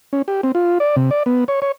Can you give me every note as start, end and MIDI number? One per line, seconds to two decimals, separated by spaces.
0.13 0.22 61
0.28 0.41 67
0.43 0.52 60
0.55 0.78 65
0.80 0.96 74
0.96 1.10 48
1.11 1.23 74
1.26 1.44 59
1.48 1.60 73
1.62 1.72 73